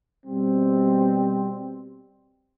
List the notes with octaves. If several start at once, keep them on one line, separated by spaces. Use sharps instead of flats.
B2 G3 C4